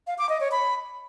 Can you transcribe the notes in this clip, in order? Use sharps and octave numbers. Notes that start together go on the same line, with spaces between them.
F5
D6
D#5
C#5
B5